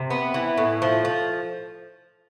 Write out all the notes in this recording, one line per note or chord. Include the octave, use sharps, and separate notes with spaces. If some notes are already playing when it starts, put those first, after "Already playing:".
Already playing: C3
B3
E3
A2
F3
F3